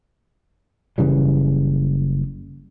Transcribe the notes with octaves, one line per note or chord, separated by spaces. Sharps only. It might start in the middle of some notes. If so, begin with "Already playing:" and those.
F#1 C#3 E3 G3